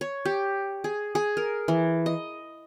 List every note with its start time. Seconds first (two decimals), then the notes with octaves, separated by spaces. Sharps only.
0.01 C#5
0.25 G4
0.84 G#4
1.15 G#4
1.37 A#4
1.68 E3
2.06 D#5